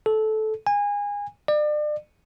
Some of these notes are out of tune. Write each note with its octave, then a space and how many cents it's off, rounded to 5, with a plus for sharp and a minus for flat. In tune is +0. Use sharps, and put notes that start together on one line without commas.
A4 -15
G#5 -25
D5 +35